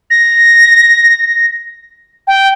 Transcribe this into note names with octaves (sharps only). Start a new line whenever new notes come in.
A#6
G5